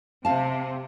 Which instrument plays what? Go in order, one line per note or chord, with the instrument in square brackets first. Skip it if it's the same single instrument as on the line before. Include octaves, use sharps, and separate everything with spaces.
[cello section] C3 [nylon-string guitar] F5 A5